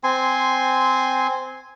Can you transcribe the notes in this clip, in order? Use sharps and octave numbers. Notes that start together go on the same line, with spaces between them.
C4 G#5 C6